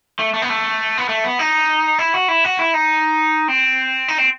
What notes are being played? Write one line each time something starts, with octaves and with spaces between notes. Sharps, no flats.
A3
A3
B3
A3
B3
A3
B3
D#4
E4
F#4
E4
F#4
E4
D#4
C4
D#4
C4